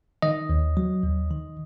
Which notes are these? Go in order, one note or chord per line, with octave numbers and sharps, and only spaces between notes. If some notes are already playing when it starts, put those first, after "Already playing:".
D#3 D#5
D#2
F#3
D#2
D#3